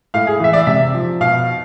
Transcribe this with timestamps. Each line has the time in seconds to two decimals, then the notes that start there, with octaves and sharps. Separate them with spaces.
0.14 A2 F5
0.27 G#4
0.40 E3 E5
0.53 D5
0.67 C3 E5
0.94 F3
1.21 B2 F5